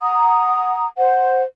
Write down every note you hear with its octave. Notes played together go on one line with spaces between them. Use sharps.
F#5 A#5 D#6
C5 F#5